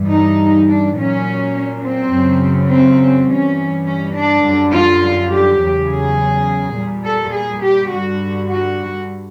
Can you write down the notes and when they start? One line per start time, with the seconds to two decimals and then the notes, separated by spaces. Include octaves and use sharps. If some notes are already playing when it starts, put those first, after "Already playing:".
Already playing: G2 E3 G3
0.10 D#4
0.68 D4
0.96 A#2 F#3 C#4
1.84 C4
2.12 F#2 C#3 F#3
2.70 C4
3.28 G2 E3 G3 C#4
3.86 C#4
4.15 D4
4.44 F#2 D3 G3
4.73 F4
5.30 G4
5.60 E2 C#3 F#3
5.89 G#4
6.76 A#2 G3
7.04 A4
7.33 G#4
7.63 G4
7.91 G2 D3 G3 F#4
8.49 F#4